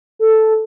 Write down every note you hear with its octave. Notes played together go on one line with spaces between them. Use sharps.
A4